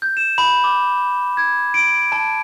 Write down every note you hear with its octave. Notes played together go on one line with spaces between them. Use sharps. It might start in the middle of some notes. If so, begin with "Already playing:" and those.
G6
E7
B5
D6
G#6
D7
A5